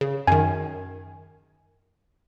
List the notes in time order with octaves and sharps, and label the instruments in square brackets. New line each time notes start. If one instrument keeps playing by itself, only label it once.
[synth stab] C#3
[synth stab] F#2 D#3 [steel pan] G#5